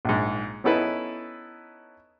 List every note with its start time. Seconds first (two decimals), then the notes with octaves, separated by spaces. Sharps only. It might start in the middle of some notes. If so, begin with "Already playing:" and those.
0.05 A#1 G#2
0.64 B3 C#4 D#4 E4 A4 B4